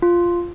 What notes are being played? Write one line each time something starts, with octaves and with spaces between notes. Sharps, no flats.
F4